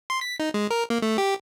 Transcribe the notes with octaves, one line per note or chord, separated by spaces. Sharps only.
C6
B6
D#4
G#3
A#4
A#3
A3
G4